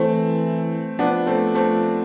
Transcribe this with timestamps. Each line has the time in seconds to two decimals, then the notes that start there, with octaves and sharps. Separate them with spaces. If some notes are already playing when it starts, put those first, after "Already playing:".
Already playing: E3 A3 C4
0.99 F3 B3 D4
1.26 A3 C4
1.55 A3 C4